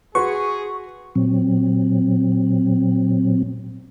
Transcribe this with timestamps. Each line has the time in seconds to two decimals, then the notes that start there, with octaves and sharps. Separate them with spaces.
0.15 F#4 G#4 B4 C6 C#6
1.15 A#2 F#3 C4